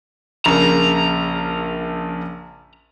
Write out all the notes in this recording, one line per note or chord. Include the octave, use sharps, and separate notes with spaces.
A#1 C#3 A#3 A#5